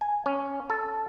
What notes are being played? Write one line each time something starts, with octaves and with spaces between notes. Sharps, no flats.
G#5
C#4
A4